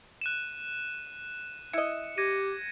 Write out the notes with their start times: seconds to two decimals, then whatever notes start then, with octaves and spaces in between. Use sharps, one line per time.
0.21 F#6 D#7 E7
1.73 E4 D#5 C#7
2.18 G4 G#6 A#6 D#7